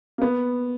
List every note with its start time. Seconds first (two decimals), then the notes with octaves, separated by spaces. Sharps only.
0.18 A#3
0.22 B3